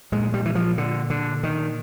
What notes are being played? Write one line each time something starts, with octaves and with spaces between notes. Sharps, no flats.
A#2 G#3
G3
E3
F3
D3
D3
D#3